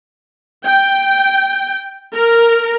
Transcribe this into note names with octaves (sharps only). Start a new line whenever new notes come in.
G5
A#4